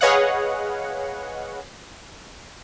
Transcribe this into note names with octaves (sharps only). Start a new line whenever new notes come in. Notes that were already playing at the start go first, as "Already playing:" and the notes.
G#4 B4 C#5 D#5 F5 F#5